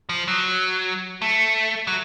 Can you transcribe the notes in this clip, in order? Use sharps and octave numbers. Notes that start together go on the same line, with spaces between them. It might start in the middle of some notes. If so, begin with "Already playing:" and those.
F3
F#3
A3
F#3